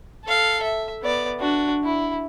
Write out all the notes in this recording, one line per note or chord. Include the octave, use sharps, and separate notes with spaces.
A4 F5
E5
B3 D5
D4 F#4
E4